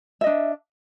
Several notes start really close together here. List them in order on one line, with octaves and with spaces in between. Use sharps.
E5 D#5 D4